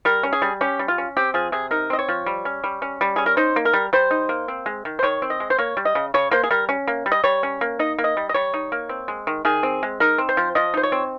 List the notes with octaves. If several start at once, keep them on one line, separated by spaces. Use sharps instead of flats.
G3 A#4
C#4
G#4
G3
C#4 G4
G3
F4
C#4
C4 G4
F3 G#4
C3 G#4
D#4 A#4
C4 D#5
C#5
F3
G3
C#4
G3
C#4
G3
C#4 G#4
A#4
D#4 C5
A#3
A#4
G3
G3 C5
D#4
A#3
C4
G#3
D#3
C5
D#3 C#5
C4
D#5
G#3
C5
A#3 C#5
G3
D#5
C#3
C#3 C#5
A#3 C5
G#4
G3 A#4
C#4
A#3
G3
D#5
G3 C#5
C#4
A#3
D#4 D#5
A#3
D#5
G3
D#5
G3 C#5
D#4
A#3
C4
G#3
D#3
D#3 G#4
C4
G#3
D#4 A#4
C4
C5
F3
F3 D#5
D#4 C5
C#5
C4